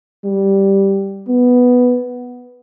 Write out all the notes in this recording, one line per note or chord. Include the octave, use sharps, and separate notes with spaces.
G3
B3